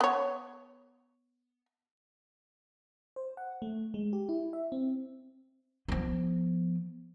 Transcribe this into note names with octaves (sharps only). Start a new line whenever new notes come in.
B3 C#5
C5
F#5
A3
G#3
G4
E4
E5
C4
F3 B3